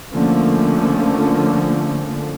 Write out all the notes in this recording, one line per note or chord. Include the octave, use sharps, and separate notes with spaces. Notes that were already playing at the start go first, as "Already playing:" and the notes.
D3 F3 A3 A#3 C#4